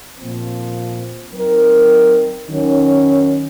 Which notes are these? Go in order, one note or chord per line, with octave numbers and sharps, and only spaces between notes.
A#2 F3 C4
F#3 C4 D#4 A#4
D#3 F#3 C#4